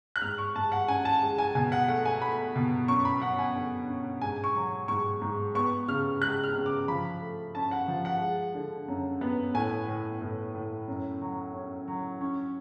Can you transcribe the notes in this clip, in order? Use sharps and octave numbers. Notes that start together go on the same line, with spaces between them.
F#6
G#2 F6
C#6
G#2 A5
F#5
C#4 G#5
A5
G#3
G#5
B2 G#5
F#5
A3 F#5
G#5
A3 B5
B2
F#2 C#6
B5
F#2 F#5
G#5
D3
C#4
G#2 G#5
C#6
F#3
G#2 C#6
G#2
B3 C#6
C#3 F6
G#3 F#6
F6
C#3
D6
F3 B5
A3
C#4 A5
F#5
F3
F#5
G#3
D3
F#2
B3
A2 G#5
A2
A2
A2
F#2
F#3
C#4
F#3
C#4